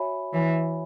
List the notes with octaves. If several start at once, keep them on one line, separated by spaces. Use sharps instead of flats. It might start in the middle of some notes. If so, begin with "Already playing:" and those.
Already playing: F#4 C#5 E5 G#5 B5
E3 F#4 C#5 E5 G#5 B5